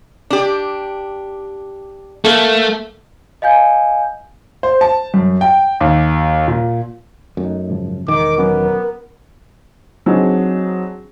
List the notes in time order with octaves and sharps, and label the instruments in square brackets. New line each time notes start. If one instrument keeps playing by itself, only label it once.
[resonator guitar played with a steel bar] D4 G4
[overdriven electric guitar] A3 [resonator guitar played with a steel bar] A#3 A4
[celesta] D#5 F5 G#5 G6
[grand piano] C5
A5
F#2
G5
D#2
A#2
[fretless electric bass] F#2 [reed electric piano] A3 D#4
[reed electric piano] G#2 C#3 F3
[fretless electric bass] E1 D#3 [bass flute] A#4 [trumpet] D6
[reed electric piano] F#3 C#4 D6 [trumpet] B3
[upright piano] F#3 C4 D4 D#4 G#4